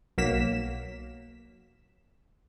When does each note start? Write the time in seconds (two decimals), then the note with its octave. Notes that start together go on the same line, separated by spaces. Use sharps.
0.18 B1 F#3 A#3 B6 E7